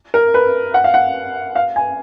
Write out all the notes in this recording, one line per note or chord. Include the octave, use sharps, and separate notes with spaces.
A#4
B4
F#5
F5
F#5
F5
G#5